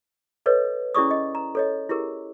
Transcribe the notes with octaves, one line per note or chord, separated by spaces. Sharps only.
A4 B4 C#5 D#5
C#4 E4 G#4 D5 C#6 D#6
D#5
A#5
A4 C#5 D#5
E4 G4 G#4 A#4